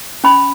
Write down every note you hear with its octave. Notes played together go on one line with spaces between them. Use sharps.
C#4 B5